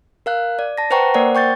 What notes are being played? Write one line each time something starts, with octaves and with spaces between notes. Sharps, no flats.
A#4 F5 F#6
D5
A5 A#6
B4 C5 F#5 G5 A#5 C#6
A#3 A#4 C5 D5 F#5
G5 C#6 G6 A6